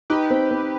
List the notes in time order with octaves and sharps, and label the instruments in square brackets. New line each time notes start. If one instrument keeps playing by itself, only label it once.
[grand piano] D#4 [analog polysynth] G4 B4
[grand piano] C4
C4